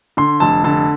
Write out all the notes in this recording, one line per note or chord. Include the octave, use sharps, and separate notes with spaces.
D3 C6
F1 A5
D3 A5